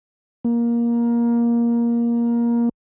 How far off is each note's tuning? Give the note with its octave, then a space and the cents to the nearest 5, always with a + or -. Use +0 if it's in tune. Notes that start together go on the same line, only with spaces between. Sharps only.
A#3 +15